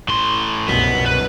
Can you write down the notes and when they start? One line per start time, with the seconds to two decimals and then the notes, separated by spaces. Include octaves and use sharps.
0.08 A2 C6
0.68 C2 F#2 B2 B3
1.06 B4